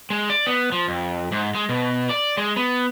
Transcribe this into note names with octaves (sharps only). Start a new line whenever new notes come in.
G#3
D5
B3
F3
F2
G#2
G#3
B2
D5
G#3
B3